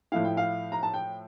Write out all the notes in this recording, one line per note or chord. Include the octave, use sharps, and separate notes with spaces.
A2 F3 A3 E4 F5
G5
F5
A#5
A5
G5